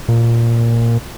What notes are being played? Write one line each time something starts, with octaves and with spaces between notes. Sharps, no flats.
A#2